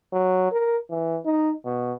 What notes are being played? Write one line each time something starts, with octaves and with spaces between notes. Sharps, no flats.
F#3
A#4
E3
D#4
B2